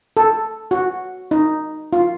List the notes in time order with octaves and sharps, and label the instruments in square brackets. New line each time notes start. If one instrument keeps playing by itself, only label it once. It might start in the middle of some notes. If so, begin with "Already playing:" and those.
[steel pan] A4
F#4
D#4
F4